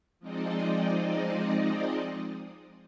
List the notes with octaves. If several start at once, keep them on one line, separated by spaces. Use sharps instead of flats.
F3 G#3 C4 D#4 D5 D#5